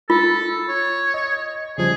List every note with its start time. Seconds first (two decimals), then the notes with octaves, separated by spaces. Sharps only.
0.10 F4 A4
0.68 C#5
1.14 D#5
1.78 C#3 F3 G3 G#4